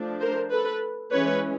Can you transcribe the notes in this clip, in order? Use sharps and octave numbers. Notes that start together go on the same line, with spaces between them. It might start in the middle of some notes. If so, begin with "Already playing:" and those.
Already playing: F3 A3 D4
A#4 C5
A4 B4
E3 G#3 C#4 B4 C#5